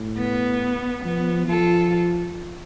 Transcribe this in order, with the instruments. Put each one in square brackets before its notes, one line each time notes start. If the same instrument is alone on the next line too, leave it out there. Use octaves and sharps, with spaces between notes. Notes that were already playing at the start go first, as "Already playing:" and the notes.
Already playing: [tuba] A2
[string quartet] B3
[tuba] F3 [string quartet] B3
[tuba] F3 [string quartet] F4 A4